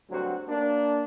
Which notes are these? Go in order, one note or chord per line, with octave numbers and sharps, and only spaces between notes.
D2 G2 F#3 C4 F#4
A#3 D4